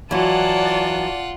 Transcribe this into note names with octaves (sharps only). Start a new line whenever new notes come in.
E3 F#3 F4 D5 F#5 A5